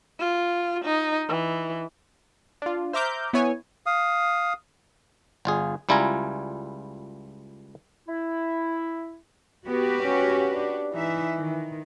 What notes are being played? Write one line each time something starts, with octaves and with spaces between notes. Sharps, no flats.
F4
D#4
E3
D4 F4
C5 E5 A#5 D6 F6 G6
B3 E4 C#5 G#5
F5 D#6
G1 F4 G#4
C#2 G3 E4 F4 G#5 A#5
E4
B3 F#4 G4 B4
C#4
D4
E3 D#4 E5
D#3